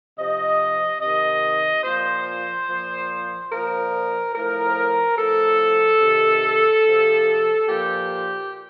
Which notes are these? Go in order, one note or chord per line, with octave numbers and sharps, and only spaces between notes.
C3 F3 D#5
C3 D#3 D#5
A#2 F3 C5
A#2 F3
A#2 F3 A#4
A2 F3 A#4
A2 F3 A4
C3 D#3
C3 F3
A#2 F3 G4